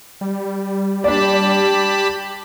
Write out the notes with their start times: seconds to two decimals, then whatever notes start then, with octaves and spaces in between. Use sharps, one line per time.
0.21 G3
1.04 D4 G4 D5 A5 B5